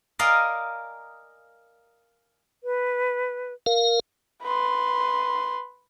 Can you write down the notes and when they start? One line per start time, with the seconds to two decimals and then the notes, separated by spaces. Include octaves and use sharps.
0.19 A#4 D5 D#5 F5 G#5 A#5
2.64 B4
3.66 A#4 F5
4.43 B4 C6